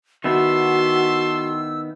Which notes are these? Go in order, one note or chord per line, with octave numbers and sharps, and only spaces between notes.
D#3 B3 E4 F#4 E5 A5 C6 E6